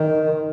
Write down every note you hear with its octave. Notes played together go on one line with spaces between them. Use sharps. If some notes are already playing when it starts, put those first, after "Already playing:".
Already playing: D#3